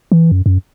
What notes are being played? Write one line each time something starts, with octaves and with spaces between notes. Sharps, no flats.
E3
F#2
F#2